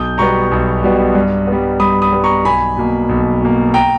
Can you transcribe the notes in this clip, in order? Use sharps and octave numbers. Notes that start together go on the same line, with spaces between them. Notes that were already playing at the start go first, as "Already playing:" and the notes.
Already playing: B1 D#6 G6
B2 G3 B3 A#5 C#6
B1
B2 G3 B3
G2
B3
G3
G2 B5 D#6
B5 D#6
G3 B3
A#5 C#6
B1 G#5 B5
B2 A#3
B1
B2 A#3
G5 A#5